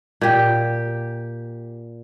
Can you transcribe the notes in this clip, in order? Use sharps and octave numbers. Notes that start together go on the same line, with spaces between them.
A#2 G4